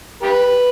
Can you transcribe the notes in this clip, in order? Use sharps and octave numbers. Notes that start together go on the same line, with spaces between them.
G4 B4